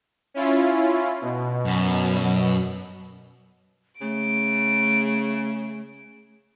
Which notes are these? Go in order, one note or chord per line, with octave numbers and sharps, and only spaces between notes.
C#4 E4 F4
B2
F#2
C#3 A3 D7